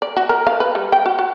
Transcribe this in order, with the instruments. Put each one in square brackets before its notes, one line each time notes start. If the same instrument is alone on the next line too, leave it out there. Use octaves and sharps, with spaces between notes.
[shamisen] D5
F#4
A#4
F5
B4
G3
G5
F#4
F#4